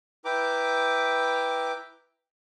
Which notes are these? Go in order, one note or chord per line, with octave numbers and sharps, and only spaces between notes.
E4 B4 G5 A#5 D6